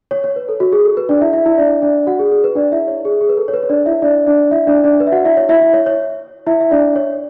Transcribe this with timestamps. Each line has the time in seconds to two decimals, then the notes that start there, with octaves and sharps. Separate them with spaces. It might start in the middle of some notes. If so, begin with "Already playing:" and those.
0.11 C#5
0.24 C#5
0.36 B4
0.49 A4
0.60 F#4
0.72 G#4
0.85 A4
0.97 B4
1.09 D4 D5
1.21 E4 E5
1.33 E4 E5
1.46 E4 E5
1.58 D4 D5
1.82 D4 D5
2.07 F#4 F#5
2.19 G#4
2.32 G#4
2.44 B4
2.55 D4 D5
2.72 E4 E5
2.88 C#5
3.05 G#4
3.21 G#4
3.29 B4
3.37 A4
3.48 C#5
3.53 B4
3.63 C#5
3.69 D4 D5
3.86 E4 E5
4.02 D4 D5
4.27 D4 D5
4.51 E4 E5
4.67 D4 D5
4.84 D4 D5
5.00 B4
5.07 E5
5.12 F#4 F#5
5.25 E4 E5
5.37 C#5
5.49 E4 E5
5.61 E4 E5
5.73 C#5
5.86 C#5
6.46 E4 E5
6.60 E5
6.71 D4 D5
6.96 C#5